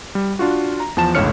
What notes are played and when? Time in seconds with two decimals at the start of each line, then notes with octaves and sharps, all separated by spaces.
0.15 G3
0.39 D4 F4 F#4
0.80 A#5
0.97 E2 F3 A5 E7
1.15 G1 C#2 A2 C#5 F6 C#7